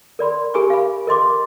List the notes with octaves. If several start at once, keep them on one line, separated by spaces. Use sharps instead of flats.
A#4 D5 B5 C6
G4 A#4 G#5 B5 C#6 D6
F5 B5
A#4 D#5 C6 D6